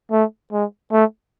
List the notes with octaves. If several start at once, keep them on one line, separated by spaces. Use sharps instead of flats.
A3
G#3
A3